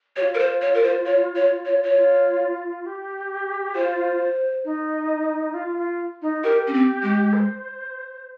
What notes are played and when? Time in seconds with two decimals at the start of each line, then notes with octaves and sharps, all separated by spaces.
0.16 G4 C#5
0.21 F4
0.35 A#4
0.39 C5
0.62 C#5
0.75 A#4
0.83 C5
1.06 C#5
1.36 C#5
1.66 C#5
1.84 C#5
1.95 F4
2.85 G4
3.75 F4 C5
4.64 D#4
5.54 F4
5.77 F4
6.22 D#4
6.44 G4 A#4
6.67 C#4
6.74 C4
7.03 G#3
7.33 C5